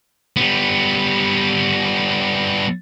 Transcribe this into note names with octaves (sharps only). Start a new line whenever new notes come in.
G3 B3